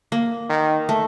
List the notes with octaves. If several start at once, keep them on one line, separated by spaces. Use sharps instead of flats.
A#3
D#3
A3